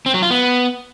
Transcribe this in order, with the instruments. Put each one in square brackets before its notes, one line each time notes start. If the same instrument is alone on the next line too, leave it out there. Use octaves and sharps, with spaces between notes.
[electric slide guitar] C4
F#3
F4
B3